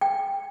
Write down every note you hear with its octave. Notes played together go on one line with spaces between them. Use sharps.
G5